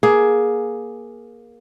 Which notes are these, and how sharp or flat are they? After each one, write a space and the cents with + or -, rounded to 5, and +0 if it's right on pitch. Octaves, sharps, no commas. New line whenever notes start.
A#3 +20 G#4 +10